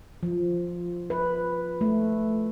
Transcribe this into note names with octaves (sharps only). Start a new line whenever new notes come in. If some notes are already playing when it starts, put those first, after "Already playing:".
F3
B4
A3